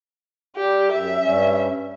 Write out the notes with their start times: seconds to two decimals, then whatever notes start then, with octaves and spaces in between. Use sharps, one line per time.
0.56 G3 G4
0.91 F#2 E5
1.22 G2 G3 C#4